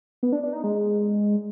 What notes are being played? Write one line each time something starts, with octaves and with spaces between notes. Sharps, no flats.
B3
D4
D4
D#4
G#3